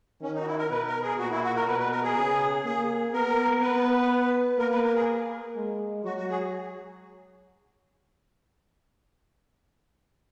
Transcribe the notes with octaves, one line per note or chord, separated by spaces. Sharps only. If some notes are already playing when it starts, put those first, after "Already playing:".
D#3 C#4
D#4
F#4
E4
A#4
B2 B4
A#4
G#4
A#2 F#4
E4
F#4
A#4
B2 B4
B4
A#4
G#4
C#3
A#3 G#4
B3 A#4
B3 B4
A#3 A#4
B4
A#4
G#4
G#3
F#3 F#4
F#4
G#4